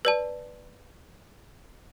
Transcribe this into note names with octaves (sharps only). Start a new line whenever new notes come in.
B4 D5 A5